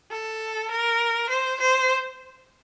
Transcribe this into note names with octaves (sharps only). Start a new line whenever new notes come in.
A4
A#4
C5
C5